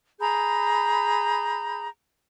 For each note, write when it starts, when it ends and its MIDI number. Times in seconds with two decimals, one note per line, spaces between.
0.20 1.87 68
0.20 1.87 82
0.20 1.87 83
0.20 1.87 91